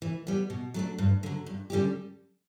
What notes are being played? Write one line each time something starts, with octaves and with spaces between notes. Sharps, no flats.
E3
G3 B3
B2
F#3 A3 D4
G2
D3 F#3
G2
D3 G3 C#4 G4